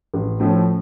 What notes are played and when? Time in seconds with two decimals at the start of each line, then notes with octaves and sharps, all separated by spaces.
0.14 A1
0.40 A2 F3 A3 C#4